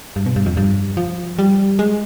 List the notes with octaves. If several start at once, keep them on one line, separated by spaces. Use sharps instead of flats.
G2
B2
G2
F2
G2
F3
G3
G#3